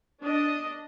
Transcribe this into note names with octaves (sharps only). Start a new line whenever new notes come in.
D4 D#5